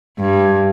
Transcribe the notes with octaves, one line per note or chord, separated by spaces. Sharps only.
G2